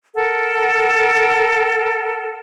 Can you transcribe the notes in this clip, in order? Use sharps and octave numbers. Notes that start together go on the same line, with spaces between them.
A4 A#4 F#5